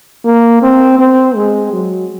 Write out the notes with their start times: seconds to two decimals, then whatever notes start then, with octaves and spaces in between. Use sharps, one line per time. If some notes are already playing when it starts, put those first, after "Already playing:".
0.25 A#3
0.62 C4
0.99 C4
1.36 G#3
1.73 F#3